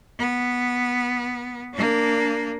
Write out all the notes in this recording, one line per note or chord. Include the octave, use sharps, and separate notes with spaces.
B3
A#3 D4